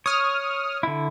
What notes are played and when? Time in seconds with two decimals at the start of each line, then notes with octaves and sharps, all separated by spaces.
0.06 C#5 D#6 F6
0.83 D3 E4